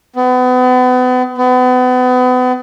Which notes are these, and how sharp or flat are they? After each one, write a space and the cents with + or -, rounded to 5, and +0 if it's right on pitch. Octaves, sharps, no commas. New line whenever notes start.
B3 +35
B3 +35